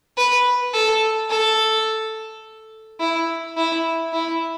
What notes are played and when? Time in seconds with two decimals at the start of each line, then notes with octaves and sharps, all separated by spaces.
0.17 B4
0.74 A4
1.30 A4
3.00 E4
3.57 E4
4.13 E4